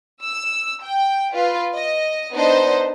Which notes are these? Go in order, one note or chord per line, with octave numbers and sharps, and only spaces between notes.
E6
G5
F4 B4
D#5
B3 D4 D#4 C5 D#5